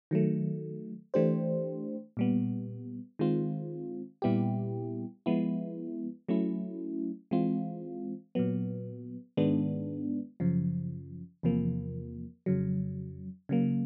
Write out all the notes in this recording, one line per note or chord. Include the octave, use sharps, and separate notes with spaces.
D#3 F#3 A3
E3 A3 D4 G4 C5
A#2 G3 B3
D#3 G#3 C4 F4
A#2 G3 B3 E4 G4
F3 G#3 B3 E4
F#3 A3 C#4 E4
E3 G#3 C4 F4
A#2 F#3 B3
G#2 D#3 G#3 B3 D4
F#2 C#3 F3
E2 C3 F3 A#3
F2 C#3 F#3
C#3 F#3 A#3